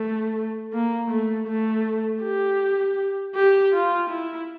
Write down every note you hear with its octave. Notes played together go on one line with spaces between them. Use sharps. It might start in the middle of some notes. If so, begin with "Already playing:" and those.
Already playing: A3
A#3
A3
A3
G4
G4
F4
E4